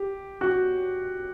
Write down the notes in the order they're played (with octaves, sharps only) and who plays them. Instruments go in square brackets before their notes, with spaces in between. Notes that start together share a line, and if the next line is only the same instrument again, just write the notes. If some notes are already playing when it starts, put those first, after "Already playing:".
Already playing: [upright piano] G4
F#4